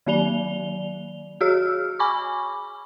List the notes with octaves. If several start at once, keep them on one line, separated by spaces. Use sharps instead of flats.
D#3 F#3 A#3 D5 F7 G7
F#4 G#4 C#5 E6 F6
G#5 B5 C#6 D6